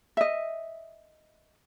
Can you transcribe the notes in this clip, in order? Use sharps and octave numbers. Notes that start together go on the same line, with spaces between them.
D#5 E5